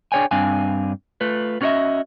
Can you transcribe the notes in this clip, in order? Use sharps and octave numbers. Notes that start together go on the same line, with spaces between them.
D4 G#4 C#5 G5 G#5
G2 C4 D4 F5 G#5
A3 F4 B4
B3 C#4 F#4 C#5 D#5 E5